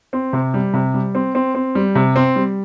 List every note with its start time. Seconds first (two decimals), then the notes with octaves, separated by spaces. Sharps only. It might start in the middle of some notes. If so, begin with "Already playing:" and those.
0.13 C4
0.33 C3
0.54 G3
0.74 C3
0.94 G3
1.15 C4
1.35 C4
1.55 C4
1.75 G3
1.95 C3
2.16 C4
2.36 G3